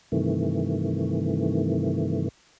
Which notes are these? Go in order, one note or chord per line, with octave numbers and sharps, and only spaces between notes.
G2 C3 D#3 E3 A3